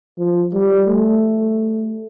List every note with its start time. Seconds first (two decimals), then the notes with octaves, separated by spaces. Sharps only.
0.18 F3
0.53 G3
0.87 A3